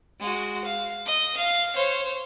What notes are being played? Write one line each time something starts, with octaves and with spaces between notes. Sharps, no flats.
G#3 F#4
F5
D#5
F5
C5 C#5